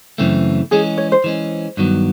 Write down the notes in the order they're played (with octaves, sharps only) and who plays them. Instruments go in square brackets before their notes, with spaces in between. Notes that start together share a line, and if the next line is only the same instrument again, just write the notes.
[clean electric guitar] F#2 C#3 E3 A3 C4
[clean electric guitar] E3 G#3 C#4 [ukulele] G#4
[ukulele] C#5
C5
[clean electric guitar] E3 G#3 C#4
G2 D#3 F#3 B3